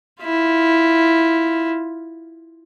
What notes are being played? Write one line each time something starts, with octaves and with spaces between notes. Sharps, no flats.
E4 F4